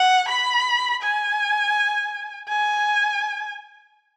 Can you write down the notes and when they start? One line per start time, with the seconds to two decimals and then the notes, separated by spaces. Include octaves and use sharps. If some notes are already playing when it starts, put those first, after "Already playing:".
Already playing: F#5
0.29 B5
1.02 G#5
2.49 G#5